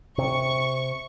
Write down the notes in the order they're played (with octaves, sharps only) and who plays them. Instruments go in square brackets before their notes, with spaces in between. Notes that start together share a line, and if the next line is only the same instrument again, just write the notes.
[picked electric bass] C3 [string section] C#6